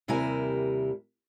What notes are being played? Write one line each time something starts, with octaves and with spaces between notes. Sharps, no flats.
D#2 C3 G3 E4 A#4 G#5